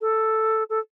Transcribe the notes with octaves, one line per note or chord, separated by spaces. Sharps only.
A4
A4